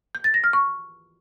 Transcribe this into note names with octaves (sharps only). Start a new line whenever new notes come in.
G6
A6
A#6
F6
C#6